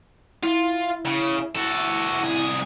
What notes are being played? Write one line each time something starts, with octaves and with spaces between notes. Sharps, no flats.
E4 F4
C#3
F#4 A4
C2 G#4